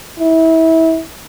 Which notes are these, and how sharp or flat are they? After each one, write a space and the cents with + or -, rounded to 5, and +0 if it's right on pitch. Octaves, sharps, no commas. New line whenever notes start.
E4 -25